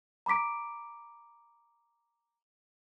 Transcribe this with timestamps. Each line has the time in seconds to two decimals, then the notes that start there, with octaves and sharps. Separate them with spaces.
0.26 A#5 B5 D6 B6 D7